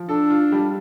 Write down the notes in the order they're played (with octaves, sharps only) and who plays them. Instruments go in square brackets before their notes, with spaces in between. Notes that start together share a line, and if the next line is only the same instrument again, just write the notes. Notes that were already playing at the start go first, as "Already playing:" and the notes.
Already playing: [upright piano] F3
[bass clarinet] D4 [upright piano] A4
[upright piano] F4
G3